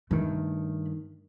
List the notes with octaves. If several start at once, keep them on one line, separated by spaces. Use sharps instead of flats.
G2 D#3 A3